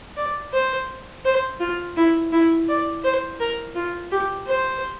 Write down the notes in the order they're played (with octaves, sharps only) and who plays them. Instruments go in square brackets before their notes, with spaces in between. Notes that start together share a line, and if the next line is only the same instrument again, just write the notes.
[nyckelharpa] D5
C5
C5
F4
E4
E4
D5
C5
A#4
F4
G4
C5